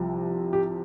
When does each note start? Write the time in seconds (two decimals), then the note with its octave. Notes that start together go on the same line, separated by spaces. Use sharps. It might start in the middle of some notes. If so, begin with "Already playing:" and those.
Already playing: C2 C3 F3
0.53 G4